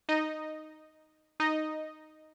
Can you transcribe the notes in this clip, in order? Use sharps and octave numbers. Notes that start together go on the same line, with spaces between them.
D#4 D#5
D#4 D#5